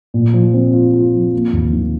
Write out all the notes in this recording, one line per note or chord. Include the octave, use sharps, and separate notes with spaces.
A#2
F3
C4
F4
F4
F3
A#3
D#2
D#3